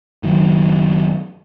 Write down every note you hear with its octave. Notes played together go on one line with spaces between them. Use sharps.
F#1 D#3 F#3